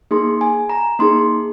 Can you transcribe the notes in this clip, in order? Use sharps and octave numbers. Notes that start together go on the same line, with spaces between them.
A#3 D#4 G#4 C6
G#5
A#5
A#3 D#4 G#4 C6